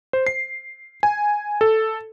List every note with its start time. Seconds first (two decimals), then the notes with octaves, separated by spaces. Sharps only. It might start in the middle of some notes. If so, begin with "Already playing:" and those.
0.13 C5
0.27 C7
1.03 G#5
1.61 A4